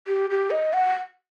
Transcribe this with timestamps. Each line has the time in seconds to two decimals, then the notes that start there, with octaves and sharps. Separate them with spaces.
0.08 G4
0.30 G4
0.51 D#5
0.73 F#5